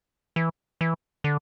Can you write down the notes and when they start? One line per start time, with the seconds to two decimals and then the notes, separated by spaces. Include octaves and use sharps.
0.36 E3
0.81 E3
1.24 D3